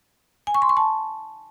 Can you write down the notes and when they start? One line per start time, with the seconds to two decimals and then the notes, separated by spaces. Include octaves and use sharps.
0.47 G#5
0.54 C#6
0.62 C6
0.69 C#6
0.77 A5